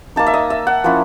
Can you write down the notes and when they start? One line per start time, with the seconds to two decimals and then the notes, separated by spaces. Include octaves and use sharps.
0.16 A#3 D#4 A5
0.27 E5
0.34 D#5
0.50 E5
0.67 F#5
0.84 F3 A#3 C#4 E4